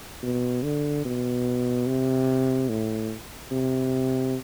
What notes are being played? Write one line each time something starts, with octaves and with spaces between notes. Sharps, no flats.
B2
D3
B2
C3
A2
C3